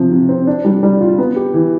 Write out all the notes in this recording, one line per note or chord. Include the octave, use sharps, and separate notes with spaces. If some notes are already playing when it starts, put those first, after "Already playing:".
Already playing: C3 F3
C3
C4
D4
G3
G3
F4
B3
G4
E3